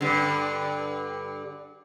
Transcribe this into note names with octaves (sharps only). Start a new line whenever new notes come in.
G2 D3